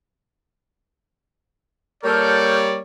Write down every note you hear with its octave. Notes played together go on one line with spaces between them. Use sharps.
G3 A#3 A4 A#4 C#5 D5 F6 G6